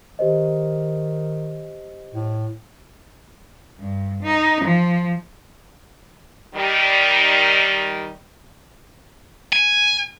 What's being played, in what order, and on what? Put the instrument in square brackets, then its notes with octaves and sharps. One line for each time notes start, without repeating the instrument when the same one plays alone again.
[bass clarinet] D#3 [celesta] G4 C5 D#5
[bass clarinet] A2
[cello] G2
D#4
F3
[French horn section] D#3 G3
[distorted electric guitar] G#5